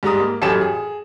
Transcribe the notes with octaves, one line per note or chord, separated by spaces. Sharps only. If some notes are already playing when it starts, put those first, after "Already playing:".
G#2 G3 G#3 A#5 D#6
A#3
A1 F#2 G4 A4 E7
G#4